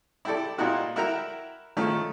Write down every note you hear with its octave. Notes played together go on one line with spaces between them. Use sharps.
E4 G4 A4 D5
A#2 A#3 D#4 E4 F#4 G4
E4 F#4 A#4 E5 G5 A#5
D#3 F3 A3 C#4